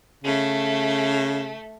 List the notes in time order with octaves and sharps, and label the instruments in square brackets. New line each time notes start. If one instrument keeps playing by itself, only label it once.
[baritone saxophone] C#3 [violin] A3